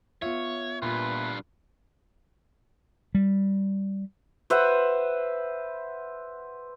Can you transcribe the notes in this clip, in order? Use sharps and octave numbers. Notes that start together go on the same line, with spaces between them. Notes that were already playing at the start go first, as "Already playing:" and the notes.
B3 F4 C#5 E5
G2 A#2 F4 B4
G3
B4 C5 E5 F#5